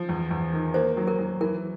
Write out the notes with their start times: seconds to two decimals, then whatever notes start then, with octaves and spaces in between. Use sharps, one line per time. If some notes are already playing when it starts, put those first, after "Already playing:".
Already playing: F3
0.09 E2
0.31 E2
0.53 D#3
0.74 A#3 C5
0.97 F#3
1.08 A#4
1.19 F#3
1.41 E3 A#4